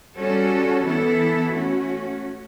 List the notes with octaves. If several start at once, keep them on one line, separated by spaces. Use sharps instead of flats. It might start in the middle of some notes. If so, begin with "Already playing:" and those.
G3 C#4 F#4 A4
E3 B3 E4 A4
A3 C#4 F#4